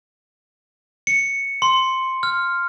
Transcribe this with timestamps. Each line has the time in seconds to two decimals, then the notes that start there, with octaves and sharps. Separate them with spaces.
1.07 C#7
1.62 C6
2.23 F6